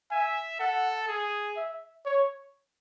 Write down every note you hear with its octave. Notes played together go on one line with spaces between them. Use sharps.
E5 G#5
A4 F#5
G#4
E5
C#5